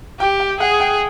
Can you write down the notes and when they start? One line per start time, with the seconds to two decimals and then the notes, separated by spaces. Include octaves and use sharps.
0.20 G4 G5
0.40 G5
0.60 G#4 F#5
0.80 G5